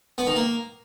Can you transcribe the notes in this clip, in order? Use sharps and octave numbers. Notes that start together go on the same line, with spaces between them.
B3
D#3
A#3